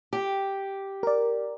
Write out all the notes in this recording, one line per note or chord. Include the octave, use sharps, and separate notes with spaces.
G4
A#4 D5